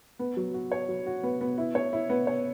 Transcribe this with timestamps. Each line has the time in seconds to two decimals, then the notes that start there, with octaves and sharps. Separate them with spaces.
0.19 B3
0.37 F#3
0.54 F#4
0.72 C#5
0.88 F#3
1.06 F#4
1.23 B3
1.41 B3
1.58 E4
1.75 C#5
1.93 E4
2.09 B3
2.27 C#5